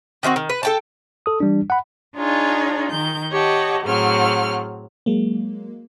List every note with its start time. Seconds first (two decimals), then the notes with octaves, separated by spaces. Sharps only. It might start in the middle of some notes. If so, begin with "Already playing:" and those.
0.23 D#3 A3 C4 F#4
0.36 D#3
0.49 B4
0.63 A4 G5 A5
1.26 A4 D#6
1.40 E3 G3 D4
1.70 F#5 B5
2.16 D4 D#4 F4 G#4 C#5
2.90 D#3 G6
3.32 G4 C#5 D#5 F#5 A5
3.84 A2 F#3 C4 G#4 F6
5.06 F#3 G#3 A#3